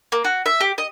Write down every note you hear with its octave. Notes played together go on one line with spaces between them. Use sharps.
A#3
F#4
E5
G4
D#5